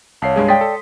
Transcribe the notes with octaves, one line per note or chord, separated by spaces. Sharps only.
C2 C#5 F5 A5 C7
G2 G#3 G#4
D5 G5 C6 D#6 B6
A4